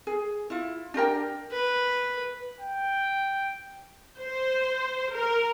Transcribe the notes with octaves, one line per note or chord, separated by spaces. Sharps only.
G#4
E4 F4
D4 G4 A#4 G5
B4
G5
C5
A#4